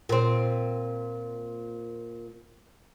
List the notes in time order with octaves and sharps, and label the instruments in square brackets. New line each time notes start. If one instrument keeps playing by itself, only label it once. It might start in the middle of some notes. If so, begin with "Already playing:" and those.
[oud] A#2 C4